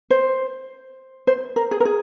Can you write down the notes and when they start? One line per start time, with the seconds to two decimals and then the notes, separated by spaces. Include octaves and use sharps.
0.10 C5
1.27 C5
1.56 A#4
1.71 G#4
1.80 A#4
1.85 G#4